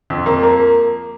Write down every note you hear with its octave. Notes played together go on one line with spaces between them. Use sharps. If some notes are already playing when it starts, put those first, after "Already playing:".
F2
A#3
A#3